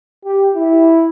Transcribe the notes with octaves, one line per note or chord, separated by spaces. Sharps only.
G4
E4